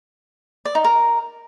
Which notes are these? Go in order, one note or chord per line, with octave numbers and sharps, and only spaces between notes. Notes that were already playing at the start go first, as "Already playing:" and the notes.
D5
D#4
A#4